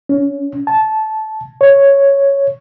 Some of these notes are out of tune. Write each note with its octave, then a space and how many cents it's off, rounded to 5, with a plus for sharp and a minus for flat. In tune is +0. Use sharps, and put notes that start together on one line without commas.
C#4 +15
A5 -15
C#5 +0